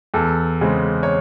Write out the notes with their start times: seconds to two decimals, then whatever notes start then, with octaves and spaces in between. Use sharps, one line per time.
0.14 E2 A4
0.61 C#3 G#3 C4
1.03 C#5